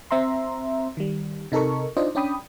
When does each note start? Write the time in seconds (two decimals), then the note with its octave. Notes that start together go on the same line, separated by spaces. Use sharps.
0.11 C4 E5 A#5 C6
0.97 D#3 G3
1.52 C3 D#4 A4 A#4 C#6
1.97 D4 D#4 F4 C5 D5 D#5
2.15 C#4 D4 D5 G5 B5 D#6